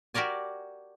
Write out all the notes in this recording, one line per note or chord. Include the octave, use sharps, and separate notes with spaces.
F#4 G4 A#4 D5 G#5